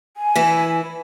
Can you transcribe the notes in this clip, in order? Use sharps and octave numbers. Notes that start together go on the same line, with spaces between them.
G#5
E3 E4